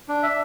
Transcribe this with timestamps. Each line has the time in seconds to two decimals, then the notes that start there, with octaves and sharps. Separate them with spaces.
0.08 D4
0.23 E5